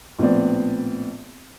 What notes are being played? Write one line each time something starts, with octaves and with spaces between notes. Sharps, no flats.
A#1 A2 B3 C4 D5